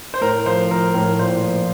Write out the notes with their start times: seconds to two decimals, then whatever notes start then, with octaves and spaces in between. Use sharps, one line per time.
0.14 C5
0.21 A2 A#4
0.46 F3 C5
0.71 F3 A#4
0.94 A2 A#4
1.19 A#2 C5
1.43 F3